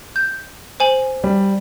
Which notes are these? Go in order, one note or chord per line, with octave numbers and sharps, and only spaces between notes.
G6
C5 G#5 F#7
G3